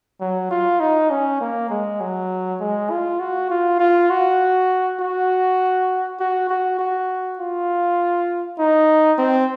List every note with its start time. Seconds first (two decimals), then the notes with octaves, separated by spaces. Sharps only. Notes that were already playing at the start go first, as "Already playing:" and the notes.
0.20 F#3
0.51 F4
0.80 D#4
1.10 C#4
1.41 A#3
1.70 G#3
2.00 F#3
2.60 G#3
2.90 F4
3.20 F#4
3.50 F4
3.80 F4
4.10 F#4
5.00 F#4
6.19 F#4
6.49 F#4
6.79 F#4
7.39 F4
8.59 D#4
9.18 C4